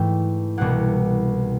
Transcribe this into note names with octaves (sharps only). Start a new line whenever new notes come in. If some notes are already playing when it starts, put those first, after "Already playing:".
Already playing: G#2 E3 A3 G5
C2 B2 G3 A#3 F#5